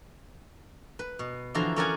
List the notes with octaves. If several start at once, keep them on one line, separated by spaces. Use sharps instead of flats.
B4
B2
D3 E3 F3 F#4 A#5 C6
C#4 A4 A#4 D5 F#5 G#5